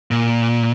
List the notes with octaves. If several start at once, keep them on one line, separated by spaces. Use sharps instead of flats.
A#2